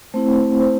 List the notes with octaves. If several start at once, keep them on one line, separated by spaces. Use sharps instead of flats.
A3 C4 E4 C5
C5